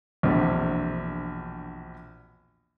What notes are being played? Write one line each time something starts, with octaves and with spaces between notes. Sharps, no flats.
A#1 E2 B2 D3 C4